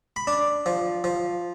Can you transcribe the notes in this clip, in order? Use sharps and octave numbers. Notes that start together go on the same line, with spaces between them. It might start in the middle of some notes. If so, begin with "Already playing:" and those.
B5
D4
F3
F3